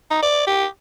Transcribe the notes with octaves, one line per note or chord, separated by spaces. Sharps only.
D#4
D5
G4